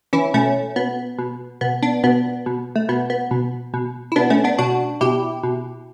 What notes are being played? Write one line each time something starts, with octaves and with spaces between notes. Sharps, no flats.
E3 C#4 E4
B2 A3 C#4
B2 B3
B2
B2 B3
B3 D4
B2 B3
B2
A3
B2 B3
B3
B2
B2
E4
B2 B3 D4
A3 C#4
B3 D4
B2 D4 F#4
B2 E4 G4
B2